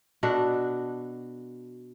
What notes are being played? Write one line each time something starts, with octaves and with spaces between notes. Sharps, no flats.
B2 D4 F#4 A4